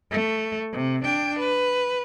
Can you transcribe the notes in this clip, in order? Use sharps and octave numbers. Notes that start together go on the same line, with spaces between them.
A3
C3
D4 G5
B4